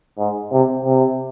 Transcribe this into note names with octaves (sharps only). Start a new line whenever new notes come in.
G#2
C3
C3